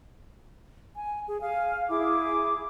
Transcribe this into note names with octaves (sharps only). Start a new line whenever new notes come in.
G#5
G#4
F5 G#5
E4 G#4 D6